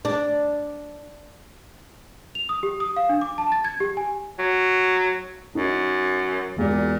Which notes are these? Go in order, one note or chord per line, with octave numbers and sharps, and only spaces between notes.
D4
F7
D#6
G4
D#6
F5
D4
D6
A5
A6
G#6
G4
G#5
F#3
F#2 D#4
E1 E2 A#2 D5